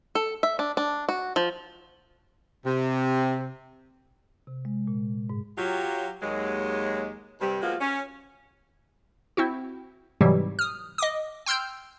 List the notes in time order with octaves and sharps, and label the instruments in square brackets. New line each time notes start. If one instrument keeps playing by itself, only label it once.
[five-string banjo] A4
E5
D4
D4
F#4
F3
[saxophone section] C3
[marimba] C3
G#3
A#2
G#2
[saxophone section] F#3 F4 G4
D#2 F#3 G#3
G2 C3 G3
F3 G#3 A#3 B3 F4 F#4
C#4
[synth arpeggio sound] C4 E4 F#4
G#2 C3 E3 F#3 G3
D#6 F6
D#5 D6 D#6
G5 C6 E6 F6 G6